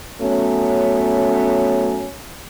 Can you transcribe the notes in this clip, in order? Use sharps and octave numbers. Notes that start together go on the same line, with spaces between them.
F#3 A3 B3 C#4